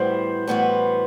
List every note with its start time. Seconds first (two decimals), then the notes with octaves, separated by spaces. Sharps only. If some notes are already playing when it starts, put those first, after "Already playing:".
Already playing: A2 E3 G3 B3 F#4 C5
0.48 A2 E3 G3 B3 F#4